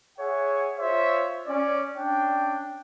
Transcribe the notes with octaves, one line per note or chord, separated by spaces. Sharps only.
G#4 C#5 E5 F#5
F4 C5 C#5 E5
C#4 D5
C#4 D4 G5